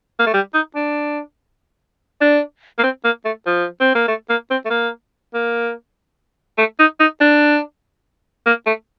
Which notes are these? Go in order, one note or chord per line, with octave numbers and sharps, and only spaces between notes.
A#3
A3
G3
D#4
D4
D4
A#3
C4
A#3
A3
F3
C4
A#3
A3
A#3
C4
A3
A#3
A#3
A3
D#4
D#4
D4
A#3
A3